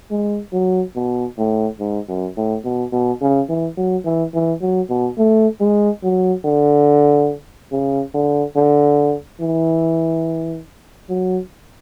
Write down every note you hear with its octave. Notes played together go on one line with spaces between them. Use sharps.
G#3
F#3
B2
A2
G#2
F#2
A2
B2
B2
C#3
E3
F#3
E3
E3
F#3
B2
A3
G#3
F#3
D3
C#3
D3
D3
E3
F#3